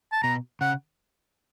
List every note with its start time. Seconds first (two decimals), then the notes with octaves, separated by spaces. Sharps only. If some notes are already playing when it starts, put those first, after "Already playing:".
0.12 A5
0.23 B2 A#5
0.61 C#3 F#5